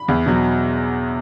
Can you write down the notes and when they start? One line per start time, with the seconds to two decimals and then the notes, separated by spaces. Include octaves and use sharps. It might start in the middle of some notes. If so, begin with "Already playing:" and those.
Already playing: B5
0.08 E2
0.26 B2 F#3